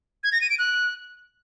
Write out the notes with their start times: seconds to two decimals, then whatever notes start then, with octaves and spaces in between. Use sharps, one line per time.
0.24 G#6
0.32 A#6
0.41 D#7
0.50 D7
0.59 F#6